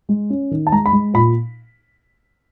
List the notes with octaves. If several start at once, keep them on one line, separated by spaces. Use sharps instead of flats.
G#3
C#4
D#3
A5
G#3 A#5
B5
G#3
A#2 B5